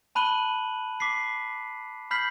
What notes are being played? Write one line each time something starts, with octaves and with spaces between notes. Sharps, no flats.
A5 B5 F#6 D#7 F#7 G7
D6 B6 C7
B5 F6 G6 B6 C7 F#7